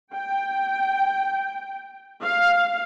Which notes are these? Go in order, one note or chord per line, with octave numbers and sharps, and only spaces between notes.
G5
F5